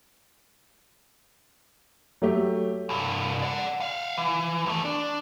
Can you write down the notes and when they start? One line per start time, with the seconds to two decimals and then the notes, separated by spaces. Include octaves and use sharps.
2.22 F#3 A3 G4
2.89 C2 G2
3.42 D5 F#5
3.81 E5 F5
4.17 E3
4.66 D#2 A3
4.85 D4